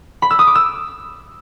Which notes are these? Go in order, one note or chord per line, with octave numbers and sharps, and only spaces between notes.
B5
E6
D#6
D6
E6